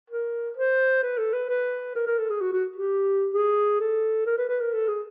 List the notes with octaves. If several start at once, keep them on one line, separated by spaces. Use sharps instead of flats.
A#4
C5
B4
A4
B4
B4
A#4
A#4
A4
G#4
F#4
F#4
G4
G#4
A4
A#4
B4
B4
A#4
A4
G#4